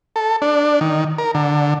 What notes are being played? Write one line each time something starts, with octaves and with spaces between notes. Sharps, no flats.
A4
D4
D#3
A#4
D3